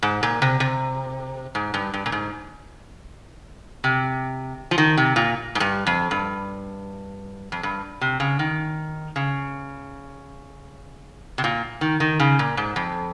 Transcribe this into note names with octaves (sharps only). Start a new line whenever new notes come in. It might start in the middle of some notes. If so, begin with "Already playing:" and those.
G#2
A#2
C3
C3
G#2
G2
G2
A#2
G#2
C3
F3
D#3
C3
A#2
G#2
G2
F2
G2
F2
G2
C3
C#3
D#3
C#3
C3
A#2
D#3
D#3
C#3
A#2
G#2
F2